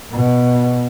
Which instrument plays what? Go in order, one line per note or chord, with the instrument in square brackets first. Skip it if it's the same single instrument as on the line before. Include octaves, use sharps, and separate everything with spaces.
[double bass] B2